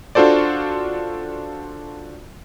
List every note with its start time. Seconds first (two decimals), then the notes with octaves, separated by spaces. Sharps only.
0.15 D4 F4 F#4 A4 C5 D5